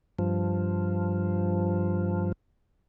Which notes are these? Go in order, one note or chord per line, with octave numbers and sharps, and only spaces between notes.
G2 F3